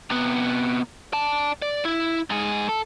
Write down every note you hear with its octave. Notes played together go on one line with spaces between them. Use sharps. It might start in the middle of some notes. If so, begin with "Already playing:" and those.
C3 B3
D5 A5
D5
E4
G#2 G#4
A4